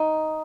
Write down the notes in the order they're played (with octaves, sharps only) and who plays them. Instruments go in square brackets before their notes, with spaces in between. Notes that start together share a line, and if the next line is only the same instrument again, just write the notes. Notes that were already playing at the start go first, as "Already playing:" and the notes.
Already playing: [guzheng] D#4